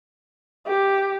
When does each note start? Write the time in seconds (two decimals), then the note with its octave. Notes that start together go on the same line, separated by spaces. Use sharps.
0.67 G4